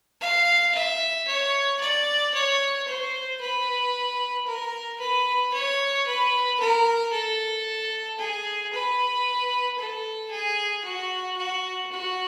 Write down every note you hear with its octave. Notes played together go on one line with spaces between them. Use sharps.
F5
E5
C#5
D5
C#5
C5
B4
A#4
B4
C#5
B4
A#4
A4
G#4
B4
A4
G#4
F#4
F#4
F#4